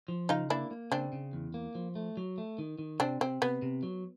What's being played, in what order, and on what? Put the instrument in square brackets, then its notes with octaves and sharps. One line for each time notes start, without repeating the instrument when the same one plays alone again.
[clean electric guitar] F3
[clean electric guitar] C#3 [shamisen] D#4 F4
[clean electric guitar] A#3 [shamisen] D4 E4
[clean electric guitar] A#3
[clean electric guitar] C#3 [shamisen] C4 D4
[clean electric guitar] C#3
E2
A#3
F3
A3
F#3
A3
D#3
D#3
[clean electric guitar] C3 [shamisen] C4 D4
[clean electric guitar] C3 [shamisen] C4
[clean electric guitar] C3 [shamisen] B3
[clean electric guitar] C3
F#3